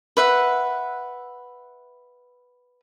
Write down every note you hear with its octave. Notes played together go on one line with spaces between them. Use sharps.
B4 E5 F#5